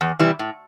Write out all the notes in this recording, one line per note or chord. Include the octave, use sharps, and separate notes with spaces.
E2
C3 E3 G3 E4
A2